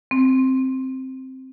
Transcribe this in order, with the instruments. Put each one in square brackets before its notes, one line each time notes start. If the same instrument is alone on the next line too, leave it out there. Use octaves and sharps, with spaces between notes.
[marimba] C4